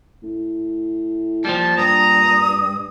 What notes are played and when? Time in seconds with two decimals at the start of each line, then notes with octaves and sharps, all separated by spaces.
0.23 A2
1.45 A#2 F3 G3 A5
1.77 G2 A#5 D#6